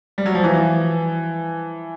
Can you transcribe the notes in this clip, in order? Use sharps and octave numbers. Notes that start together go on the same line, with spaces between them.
G3
F#3
F3
E3